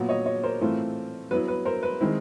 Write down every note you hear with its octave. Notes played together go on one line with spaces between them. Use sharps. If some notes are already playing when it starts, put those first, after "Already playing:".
Already playing: A#2 F#3 B3
C#5 D#5
C#5 D#5
A#4 C5
A2 E3 A3 C4 F4
F#3 B3 E4 B4
B4
A#4 C5
B4
D#3 G#3 C4 E4